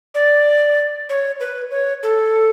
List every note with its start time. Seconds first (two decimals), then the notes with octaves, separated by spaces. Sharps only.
0.15 D5
1.09 C#5
1.40 B4
1.71 C#5
2.03 A4